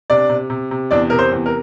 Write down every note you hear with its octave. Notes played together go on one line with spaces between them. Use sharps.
C3 D4 D5
C3
C3
C3
E2 D4 D5
C3 A#4
C5
E2
A#4